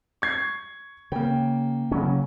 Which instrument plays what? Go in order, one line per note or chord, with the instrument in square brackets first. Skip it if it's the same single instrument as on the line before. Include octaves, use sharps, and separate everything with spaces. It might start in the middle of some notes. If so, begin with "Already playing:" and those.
[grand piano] C#6 G#6 C7
[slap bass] C#3 [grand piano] A#3 G5
[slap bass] C#3 F#3 C#4